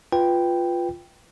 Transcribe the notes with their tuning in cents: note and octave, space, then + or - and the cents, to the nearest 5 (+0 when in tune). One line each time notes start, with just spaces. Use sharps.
F4 +0 B4 +0 G5 +0